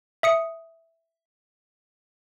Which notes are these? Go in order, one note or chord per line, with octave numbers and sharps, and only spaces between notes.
E5 D#6 C#7